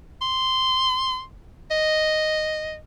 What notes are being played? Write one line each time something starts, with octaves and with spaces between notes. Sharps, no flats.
C6
D#5